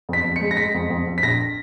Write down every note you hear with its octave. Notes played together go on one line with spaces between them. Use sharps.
F2 B6
F2
C#7
G#3
A#6
G#3 B6
F2
F2
F2
B6
A#1 A#6